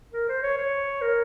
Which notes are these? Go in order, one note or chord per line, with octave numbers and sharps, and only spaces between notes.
A#4
C5
C#5
C#5
A#4